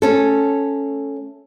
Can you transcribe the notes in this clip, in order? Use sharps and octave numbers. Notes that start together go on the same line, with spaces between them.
A3 C#4 A4